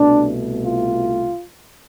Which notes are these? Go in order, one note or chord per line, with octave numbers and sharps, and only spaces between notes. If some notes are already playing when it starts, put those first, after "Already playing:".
Already playing: C2 B2 A3 D4
F4